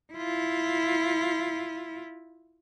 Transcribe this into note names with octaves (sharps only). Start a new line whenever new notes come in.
E4 F4